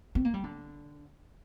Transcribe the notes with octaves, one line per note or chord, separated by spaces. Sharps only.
C4
A#3
G3
D3